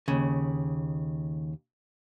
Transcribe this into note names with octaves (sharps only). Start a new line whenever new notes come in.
D#2 C#3